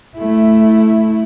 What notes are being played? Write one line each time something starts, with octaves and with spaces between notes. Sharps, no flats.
A3 E4